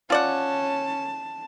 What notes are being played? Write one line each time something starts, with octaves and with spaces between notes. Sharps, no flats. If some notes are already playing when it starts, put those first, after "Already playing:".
C#4 F4 D5 F#5 A5